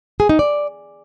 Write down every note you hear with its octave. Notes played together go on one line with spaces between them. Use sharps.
G#4
D#4
D5